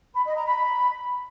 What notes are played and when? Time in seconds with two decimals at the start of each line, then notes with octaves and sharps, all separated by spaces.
0.14 B5
0.25 D#5
0.35 A#5
0.46 B5